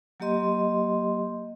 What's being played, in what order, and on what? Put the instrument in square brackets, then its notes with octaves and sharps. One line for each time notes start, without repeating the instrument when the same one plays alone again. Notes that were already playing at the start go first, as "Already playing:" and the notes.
[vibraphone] F#3 A#3 G4 D#5 C6